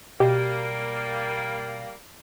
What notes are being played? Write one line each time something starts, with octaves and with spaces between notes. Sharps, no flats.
B2 G3 A#3 G4